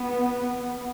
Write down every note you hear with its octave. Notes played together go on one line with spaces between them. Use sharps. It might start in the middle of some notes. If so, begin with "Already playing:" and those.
Already playing: B3